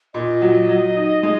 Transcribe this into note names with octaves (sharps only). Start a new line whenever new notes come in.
A#2 D#5
F#3
F#3
D#4
G#3